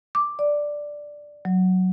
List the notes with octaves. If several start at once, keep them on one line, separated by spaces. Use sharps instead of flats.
D6
D5
F#3